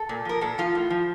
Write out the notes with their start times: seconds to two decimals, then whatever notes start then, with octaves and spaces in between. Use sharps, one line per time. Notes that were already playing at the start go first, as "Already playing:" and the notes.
Already playing: A4
0.09 A#2
0.25 F3 A#4
0.41 A#2 A4
0.58 F3 F4
0.75 A2
0.90 F3